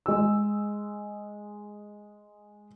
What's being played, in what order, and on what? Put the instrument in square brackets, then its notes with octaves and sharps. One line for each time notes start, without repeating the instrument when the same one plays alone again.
[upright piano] G#3 E6